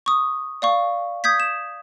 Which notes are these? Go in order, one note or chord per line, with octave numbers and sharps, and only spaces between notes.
C#6 D#6
D5 F5 C#6
D#6 G6 G#6 B6
E7